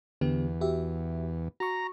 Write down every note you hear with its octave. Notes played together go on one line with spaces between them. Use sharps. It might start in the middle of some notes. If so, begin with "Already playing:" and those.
E2 D3 B3 G4
F#4 G4 E5
F#4 A#5 C#6